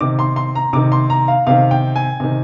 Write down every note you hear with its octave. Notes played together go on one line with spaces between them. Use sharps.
C3 D#3 D6
C6
C6
A#5
C3 D#3 D6
C6
A#5
F5
C3 D#3 F5
G5
G#5
C3 D#3